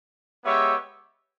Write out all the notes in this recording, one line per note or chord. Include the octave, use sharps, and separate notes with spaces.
G#3 B3 G4 C#5 E5